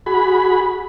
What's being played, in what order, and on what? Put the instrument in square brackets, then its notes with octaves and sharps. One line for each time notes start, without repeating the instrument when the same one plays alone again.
[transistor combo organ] F#4 G#4 B5